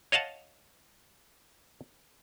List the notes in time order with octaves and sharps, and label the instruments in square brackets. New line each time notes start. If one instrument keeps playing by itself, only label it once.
[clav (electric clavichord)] C#5 D#5 F5 F#5 A5